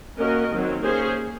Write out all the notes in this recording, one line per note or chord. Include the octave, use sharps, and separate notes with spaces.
A#3 C#4 F#4 A#4 D#5
D#3 F#3 C4
A#3 C#4 G#4 C5